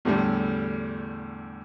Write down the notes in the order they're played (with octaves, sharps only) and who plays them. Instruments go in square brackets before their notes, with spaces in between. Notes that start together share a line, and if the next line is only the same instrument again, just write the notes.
[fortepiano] E2 A2 D3 G3